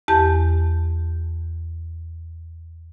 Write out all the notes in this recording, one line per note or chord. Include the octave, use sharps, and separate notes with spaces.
E2 G4 A5 G6